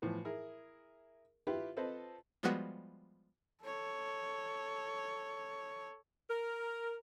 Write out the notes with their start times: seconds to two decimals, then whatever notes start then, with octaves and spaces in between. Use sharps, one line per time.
0.02 A2 E3 F3 B3
0.25 E4 G#4 A#4
1.47 E4 F4 G4 B4
1.77 C4 F4 A4 B4 C5 D#5
2.43 F3 G3 G#3 B3 F#4
3.63 A4 C#5
6.29 A#4